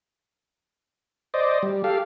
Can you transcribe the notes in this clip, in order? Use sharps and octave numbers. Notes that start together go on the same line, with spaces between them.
C5 D5 D#5
G3
G4 A4 F5